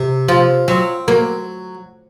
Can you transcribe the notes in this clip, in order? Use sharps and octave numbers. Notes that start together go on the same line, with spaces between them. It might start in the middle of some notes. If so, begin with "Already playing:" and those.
Already playing: C3
F3 F4
F#3 C4
F#3 A#3